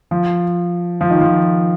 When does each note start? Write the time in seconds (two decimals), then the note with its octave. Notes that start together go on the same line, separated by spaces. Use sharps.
0.11 F3
1.01 F3
1.10 D#3
1.21 F3